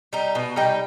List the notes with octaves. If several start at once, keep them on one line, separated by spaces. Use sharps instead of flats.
G3 D#4
B2
G3 D#4 G5